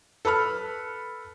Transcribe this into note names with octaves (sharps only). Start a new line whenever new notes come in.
A4 B4 B5 F6